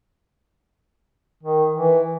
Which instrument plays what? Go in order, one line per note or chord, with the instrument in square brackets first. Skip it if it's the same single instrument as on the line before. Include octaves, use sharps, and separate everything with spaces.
[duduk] D#3
E3